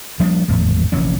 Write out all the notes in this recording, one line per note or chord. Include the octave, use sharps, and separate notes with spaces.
F3 G3 A#3 D4
G#1 E2 A2 F3
F1 A#1 E3 C#4